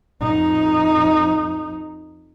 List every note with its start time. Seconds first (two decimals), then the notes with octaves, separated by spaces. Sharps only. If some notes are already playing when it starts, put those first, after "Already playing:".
0.22 F2 D#4